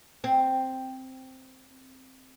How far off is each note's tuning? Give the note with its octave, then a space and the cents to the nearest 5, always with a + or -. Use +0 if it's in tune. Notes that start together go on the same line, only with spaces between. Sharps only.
C4 +0